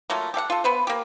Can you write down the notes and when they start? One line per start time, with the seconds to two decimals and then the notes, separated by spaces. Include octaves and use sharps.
0.10 F#3 A3 A#3 F4
0.34 G4 A4 F5 F#5
0.50 F4 A4
0.64 B3 B4 C5
0.87 A#3 G4